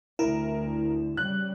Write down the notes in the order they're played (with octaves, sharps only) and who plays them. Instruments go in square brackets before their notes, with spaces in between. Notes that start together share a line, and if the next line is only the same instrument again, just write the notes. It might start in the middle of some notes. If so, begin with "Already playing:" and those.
[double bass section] D2 [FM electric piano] E4 [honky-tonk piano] A#4
[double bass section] C#3 G3 [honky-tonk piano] F#6